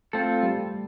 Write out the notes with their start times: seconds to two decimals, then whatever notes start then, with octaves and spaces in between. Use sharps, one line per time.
0.13 A3 C4 F4 A4
0.43 G3